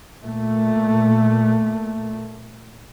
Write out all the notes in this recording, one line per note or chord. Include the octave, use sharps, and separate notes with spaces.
A#2 A3